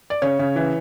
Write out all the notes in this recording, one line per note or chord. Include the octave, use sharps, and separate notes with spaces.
D5
C#3 C#5
C#3
E3